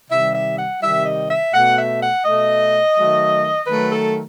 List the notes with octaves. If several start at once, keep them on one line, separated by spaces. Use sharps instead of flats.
C3 D#3 G3 E5
E5
F#5
C3 D#3 G3 E5
D#5
E5
B2 A3 F#5
E5
F#5
B2 A3 D#5
D#3 F#3 A3
D#3 F#3 A3 B4
A4